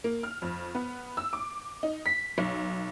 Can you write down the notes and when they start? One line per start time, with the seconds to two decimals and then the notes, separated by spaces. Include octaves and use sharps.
0.04 A#3
0.23 F6
0.42 F2
0.75 B3
1.17 E6
1.33 D6
1.83 D#4
2.06 B6
2.38 B1